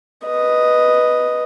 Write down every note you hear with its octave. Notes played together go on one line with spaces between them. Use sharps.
B4 D#5